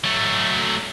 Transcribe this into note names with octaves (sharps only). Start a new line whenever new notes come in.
F#3 A3